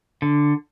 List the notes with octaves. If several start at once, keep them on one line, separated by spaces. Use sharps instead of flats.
D3